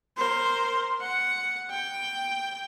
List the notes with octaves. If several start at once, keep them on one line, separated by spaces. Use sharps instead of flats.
A#4 C5
F#5
G5